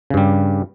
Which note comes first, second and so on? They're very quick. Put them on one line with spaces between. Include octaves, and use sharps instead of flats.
C#3 G2 G3